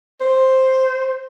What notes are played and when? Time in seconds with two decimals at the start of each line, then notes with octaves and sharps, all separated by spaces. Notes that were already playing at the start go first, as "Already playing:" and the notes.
0.21 C5